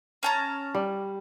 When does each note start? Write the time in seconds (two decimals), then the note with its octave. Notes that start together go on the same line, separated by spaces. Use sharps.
0.23 C#4 A5 A#5
0.75 G3